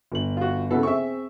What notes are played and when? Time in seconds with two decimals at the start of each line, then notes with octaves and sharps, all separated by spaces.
0.12 G1 F#7
0.37 F4 F#4
0.71 C#3 B3 E4 F#4 A4
0.83 C4 G#4 E5 C#6